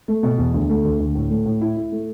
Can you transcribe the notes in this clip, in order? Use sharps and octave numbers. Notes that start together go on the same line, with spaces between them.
A3
B2
E2
D2
A3
D2
D2
A2
A3
A2
E4
E4
A3